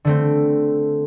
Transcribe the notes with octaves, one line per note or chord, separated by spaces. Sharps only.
D3 A3 C4